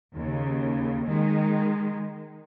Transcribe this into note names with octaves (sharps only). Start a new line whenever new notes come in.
D#2 C#3
D#3 G#3